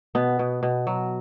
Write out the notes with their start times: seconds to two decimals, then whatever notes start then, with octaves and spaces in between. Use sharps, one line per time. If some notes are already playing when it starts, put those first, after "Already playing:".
0.15 B2 B3
0.39 B2
0.63 B2
0.87 F#3